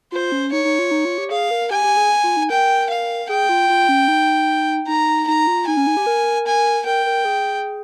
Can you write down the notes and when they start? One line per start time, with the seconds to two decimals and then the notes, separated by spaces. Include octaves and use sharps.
0.12 F4 C5
0.32 C#4
0.52 D#4 C#5
0.65 D#4
0.79 F4
0.91 D#4
1.05 F4
1.18 G4
1.31 G#4 F5
1.51 A#4
1.71 G4 G#5
1.84 G4
1.97 G#4
2.24 F4
2.37 D#4
2.50 A#4 G5
2.90 F5
3.29 G#4 G5
3.49 F4
3.69 F4
3.89 C#4
4.08 D#4
4.87 D#4 A#5
5.27 D#4 A#5
5.47 F4
5.67 D#4 G#5
5.77 C#4
5.87 D#4
5.97 G4
6.06 A#4
6.47 G#5
6.86 A#4 G5
7.06 A#4
7.25 G#4